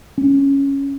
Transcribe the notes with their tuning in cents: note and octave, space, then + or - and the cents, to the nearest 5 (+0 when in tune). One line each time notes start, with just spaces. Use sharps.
C#4 +0